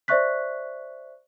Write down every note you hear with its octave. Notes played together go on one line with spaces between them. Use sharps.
C5 D5 E5 C#6 F#6 B6